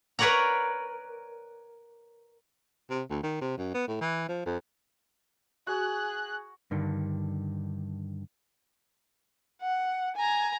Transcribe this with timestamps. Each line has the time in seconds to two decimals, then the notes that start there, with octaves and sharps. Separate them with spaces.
0.19 A#4 B4 C#5 D5 F#5 A#5
2.90 C3
3.10 D2
3.23 D#3
3.41 C3
3.58 F#2
3.75 B3
3.87 A2
4.01 E3
4.28 F3
4.46 F2
5.67 F#4 G#4 F#6
6.71 G2 D3 D#3
9.62 F#5
10.16 G#5 A#5